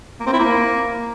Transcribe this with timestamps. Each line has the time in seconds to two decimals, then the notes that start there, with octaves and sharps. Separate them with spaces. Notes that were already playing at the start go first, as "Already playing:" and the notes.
0.20 A#3
0.27 C4
0.33 E4
0.39 A#3